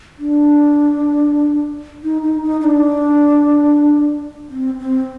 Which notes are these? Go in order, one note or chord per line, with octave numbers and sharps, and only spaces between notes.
D4
D#4
D#4
D#4
D#4
D4
C4
C4